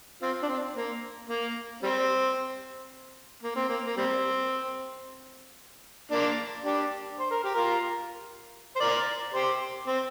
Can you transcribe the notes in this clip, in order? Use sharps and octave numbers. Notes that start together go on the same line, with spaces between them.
C4 F4
D4
C4
A#3
A#3
G3 C4
A#3
C4
A#3
A#3
G3 C4
A#3 D4
D4 G4
C5
A#4
G4
F4 A#4
C5
A#4 D5
G4 C5
C4